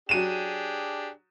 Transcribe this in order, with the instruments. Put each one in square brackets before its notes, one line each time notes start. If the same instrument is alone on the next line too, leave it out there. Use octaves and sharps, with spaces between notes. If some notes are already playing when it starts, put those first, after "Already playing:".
[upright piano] F#3 D#7 E7 [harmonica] D4 G4 G#4